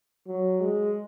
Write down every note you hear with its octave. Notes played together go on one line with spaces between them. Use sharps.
F#3
G#3